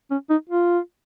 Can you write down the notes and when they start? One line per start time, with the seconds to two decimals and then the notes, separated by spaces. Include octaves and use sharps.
0.11 C#4
0.30 D#4
0.49 F4